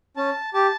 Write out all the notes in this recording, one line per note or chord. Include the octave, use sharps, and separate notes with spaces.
C#4 A5
G4 A5